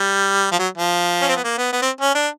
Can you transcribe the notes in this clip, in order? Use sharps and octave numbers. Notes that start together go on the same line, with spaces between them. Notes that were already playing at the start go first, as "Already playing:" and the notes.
Already playing: G3
F3
F#3
F3
C#4
C4
B3
A#3
B3
B3
C4
C#4
D4